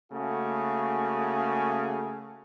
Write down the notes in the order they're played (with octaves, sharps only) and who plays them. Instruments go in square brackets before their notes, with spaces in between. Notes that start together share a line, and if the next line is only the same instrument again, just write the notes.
[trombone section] C#3 A3 A#3 F#4 G#4